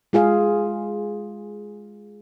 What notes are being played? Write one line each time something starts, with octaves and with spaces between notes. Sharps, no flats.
G#3 F4 G#4 F5